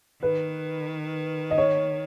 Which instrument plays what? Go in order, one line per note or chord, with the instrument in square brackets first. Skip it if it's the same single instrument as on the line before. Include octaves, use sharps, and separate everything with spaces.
[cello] D#3 [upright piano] B4
[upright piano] D#5
C#5